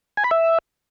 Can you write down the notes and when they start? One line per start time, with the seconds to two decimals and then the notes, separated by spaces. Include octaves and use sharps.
0.17 G#5
0.24 B5
0.31 E5